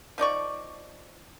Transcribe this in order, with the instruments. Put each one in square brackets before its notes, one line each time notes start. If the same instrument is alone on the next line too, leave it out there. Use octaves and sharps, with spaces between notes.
[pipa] F3 D#4 D5 C#6